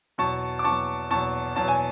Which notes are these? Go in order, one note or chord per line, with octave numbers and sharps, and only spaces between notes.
E2 B2 F#3 A5 C#6
D6
E2 B2 F#3 A5 C#6
E2 B2 F#3 A5 C#6
E2 B2 F#3 A5
G#5